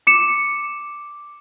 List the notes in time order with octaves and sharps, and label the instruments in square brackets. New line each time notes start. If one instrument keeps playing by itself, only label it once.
[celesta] D6 C#7 E7